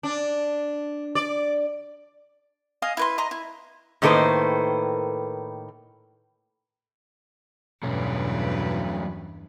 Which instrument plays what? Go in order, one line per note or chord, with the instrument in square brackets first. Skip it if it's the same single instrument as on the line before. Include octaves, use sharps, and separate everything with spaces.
[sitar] D4
D5
[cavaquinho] D#5 F5 G#5 D#6
E4 B4 C6
D#5 A#5 C6
E4
[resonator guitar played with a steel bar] A2 D#3 A#3 A4 B4 C5
[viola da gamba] E2 G2 B4 [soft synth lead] B2 [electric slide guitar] F#3 A3 C#4